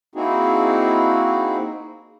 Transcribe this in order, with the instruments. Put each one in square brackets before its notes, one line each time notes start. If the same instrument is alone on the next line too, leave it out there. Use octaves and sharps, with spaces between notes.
[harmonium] A#3 C4 D#4 E4 F#4 G#4